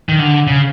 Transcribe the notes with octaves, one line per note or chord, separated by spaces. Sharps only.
D#3
D3
C#3